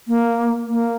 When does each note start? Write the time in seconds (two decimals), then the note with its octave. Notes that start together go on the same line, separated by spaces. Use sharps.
0.08 A#3
0.69 A#3